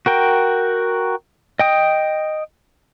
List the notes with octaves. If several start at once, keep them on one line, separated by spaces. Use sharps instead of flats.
F#4 A#4 G5
D#5 G5 D#6